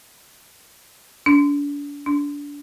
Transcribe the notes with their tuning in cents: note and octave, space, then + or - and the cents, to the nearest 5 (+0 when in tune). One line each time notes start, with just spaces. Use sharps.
D4 -35
D4 -25